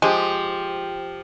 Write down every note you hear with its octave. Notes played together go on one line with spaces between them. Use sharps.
F3 G#3 G4